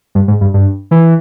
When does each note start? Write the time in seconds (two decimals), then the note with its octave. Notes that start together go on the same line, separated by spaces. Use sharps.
0.15 G2
0.28 G#2
0.41 G2
0.54 G2
0.91 E3